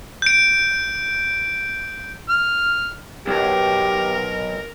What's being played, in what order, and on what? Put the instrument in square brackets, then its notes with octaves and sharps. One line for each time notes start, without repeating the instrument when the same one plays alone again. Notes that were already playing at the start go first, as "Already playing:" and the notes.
[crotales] G6 D7
[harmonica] F6
[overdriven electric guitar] B1 [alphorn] G4 [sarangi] A#4